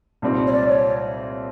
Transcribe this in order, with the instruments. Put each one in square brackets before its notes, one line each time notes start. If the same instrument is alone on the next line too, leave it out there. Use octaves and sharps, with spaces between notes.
[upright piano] C2 A#2 G3 C4 D#4
[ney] C#5
D5
C#5